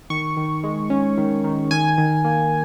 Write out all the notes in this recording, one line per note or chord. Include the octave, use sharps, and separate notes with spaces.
D#3 C#6
D#3
G#3
C#4
D#3
D#3
D#3 G#5
D#3
A#3